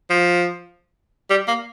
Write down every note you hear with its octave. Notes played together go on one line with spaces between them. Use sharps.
F3
G3
A#3